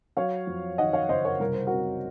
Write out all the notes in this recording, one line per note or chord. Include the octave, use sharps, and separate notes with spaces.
F#3 C#5 F5
F2
D#3 D#5 F#5
C#5 F5
F#1 C5 D#5
A#4 C#5
C2 A#4
C5
C3 F#4 A#4